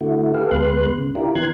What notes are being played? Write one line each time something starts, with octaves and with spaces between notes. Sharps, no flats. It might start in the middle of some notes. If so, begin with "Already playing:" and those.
D3 A3 E4 F#4
G4 A4 B4 F5
D2 G#3 B3 B4 C6 F#6
C#3
D4 E4 F4 G4 A#4
D#3 E3 B3 C6 F#6 G#6